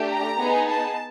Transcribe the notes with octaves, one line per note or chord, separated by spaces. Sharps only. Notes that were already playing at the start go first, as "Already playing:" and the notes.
Already playing: A3 D4 G4
A#5
B3 D#4 G#4
A5